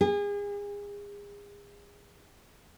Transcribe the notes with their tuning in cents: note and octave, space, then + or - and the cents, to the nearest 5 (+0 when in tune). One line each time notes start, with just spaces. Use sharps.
G#4 -35